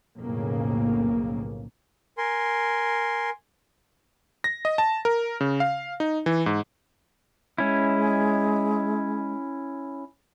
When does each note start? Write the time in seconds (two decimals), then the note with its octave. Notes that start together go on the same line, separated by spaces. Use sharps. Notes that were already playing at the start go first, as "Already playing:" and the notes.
0.18 B1 F2 A2 C#3 A#3
2.18 A#4 G#5 C6
4.44 A#6
4.65 D#5
4.78 A5
5.05 A#4
5.41 C#3
5.60 F5
6.00 D#4
6.26 E3
6.46 G#2
7.58 G#3 C#4 E4